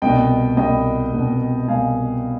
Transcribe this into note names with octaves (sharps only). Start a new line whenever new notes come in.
C2 B2 D#5 G5
C2 B2 D#5 G5
C2 B2
C2 B2 F5 G#5